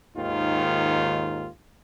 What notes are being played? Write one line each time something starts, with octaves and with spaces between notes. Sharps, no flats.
D#2 G#2 D#3 F4